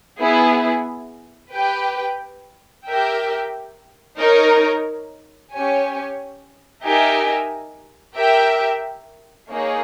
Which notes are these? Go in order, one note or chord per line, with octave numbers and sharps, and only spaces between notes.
B3 E4 G#4
G4 B4 G5
G4 A#4 E5 G5
D#4 A#4 C#5
C#4 G4 C#5 G#5
D#4 G4 A#4 E5 G#5
G4 A#4 E5 G5
A#3 D#4 G#4 C#5